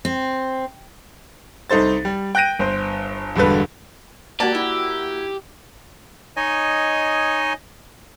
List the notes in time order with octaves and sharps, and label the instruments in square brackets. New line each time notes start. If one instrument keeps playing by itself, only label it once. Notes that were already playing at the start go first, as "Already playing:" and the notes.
[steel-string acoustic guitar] C4
[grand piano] C2 D#4 A4 C5 A6
G3
G5 F#6 G6 A#6 D7 D#7
G1 C5
E1 G2 D3 B4
[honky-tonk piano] A#3 F#4 [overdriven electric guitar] G4 [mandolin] D5 A5
[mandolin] E4
[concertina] D#4 C#5 D#5 G#5